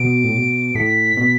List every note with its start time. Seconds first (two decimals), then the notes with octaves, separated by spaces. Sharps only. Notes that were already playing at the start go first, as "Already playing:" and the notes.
Already playing: B2 D7
0.24 A2
0.34 B2
0.75 A2 B6
1.17 B2